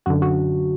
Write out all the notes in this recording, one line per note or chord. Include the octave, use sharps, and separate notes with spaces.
F#2 D3 F#4
F#4